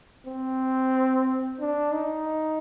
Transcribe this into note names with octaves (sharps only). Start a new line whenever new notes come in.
C4
D4
D#4